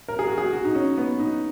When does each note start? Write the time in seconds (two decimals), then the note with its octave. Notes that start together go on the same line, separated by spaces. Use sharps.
0.08 A#4
0.19 G#4
0.28 F#4
0.38 G#4
0.53 F#4
0.65 D#4
0.75 C#4
0.98 B3
1.20 D#4